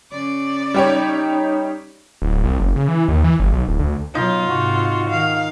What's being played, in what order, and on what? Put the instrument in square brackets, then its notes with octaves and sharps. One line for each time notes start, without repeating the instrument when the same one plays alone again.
[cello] C#3 D5
[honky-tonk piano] G3 G4 C#5 [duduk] D#4
[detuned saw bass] D1
C2
F#1
C#3
E3
D#2
E3
G1
B1
D1
D2
[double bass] B2 F#3 [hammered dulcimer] D#4 [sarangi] F4
[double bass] G#2 C3 [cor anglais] F#4
[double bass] D#3 [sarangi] F5